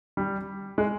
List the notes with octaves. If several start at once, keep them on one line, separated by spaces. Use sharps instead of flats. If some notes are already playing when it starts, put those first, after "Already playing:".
G3
G#3